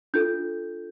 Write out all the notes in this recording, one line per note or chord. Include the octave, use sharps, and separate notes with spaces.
D4 F4 A4 G6